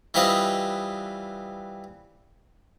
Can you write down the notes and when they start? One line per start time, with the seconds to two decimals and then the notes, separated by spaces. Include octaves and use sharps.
0.14 E3 G3 C4 F4 B4 D#5